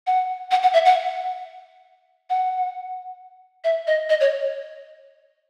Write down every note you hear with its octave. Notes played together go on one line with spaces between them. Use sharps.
F#5
F#5
F#5
E5
F#5
F#5
E5
D#5
D#5
C#5